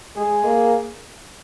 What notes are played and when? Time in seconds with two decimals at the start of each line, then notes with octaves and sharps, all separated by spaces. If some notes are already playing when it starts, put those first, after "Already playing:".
0.16 G#3 G#4
0.44 A#3